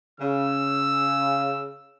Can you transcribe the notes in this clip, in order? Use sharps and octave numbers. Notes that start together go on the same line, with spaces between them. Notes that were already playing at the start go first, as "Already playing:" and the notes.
C#3 E6